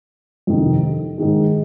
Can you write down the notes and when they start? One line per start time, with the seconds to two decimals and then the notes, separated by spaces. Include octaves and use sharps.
0.47 F2 C3 D#3
1.18 G#2 D#3 G#3